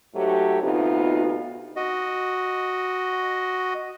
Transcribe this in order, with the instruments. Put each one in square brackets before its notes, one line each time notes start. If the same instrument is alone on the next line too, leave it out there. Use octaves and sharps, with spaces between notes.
[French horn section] G#2 F#3 A3 G4
D2 C3 B3 D#4 F4
[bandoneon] F#4 D#5